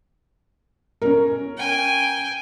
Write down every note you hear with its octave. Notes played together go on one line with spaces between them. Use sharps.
C#4 A#4
G5 G#5